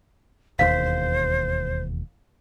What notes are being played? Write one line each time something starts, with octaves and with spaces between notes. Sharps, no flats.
E1 D#2 C5 F5